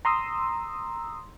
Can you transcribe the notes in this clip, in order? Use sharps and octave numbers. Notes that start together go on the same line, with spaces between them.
A#5 C6 D#6 E6